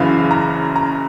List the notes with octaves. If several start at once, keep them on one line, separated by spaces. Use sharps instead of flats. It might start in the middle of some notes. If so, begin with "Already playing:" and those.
Already playing: F#1 F#2 C#3 E3 F5
A#5
A#5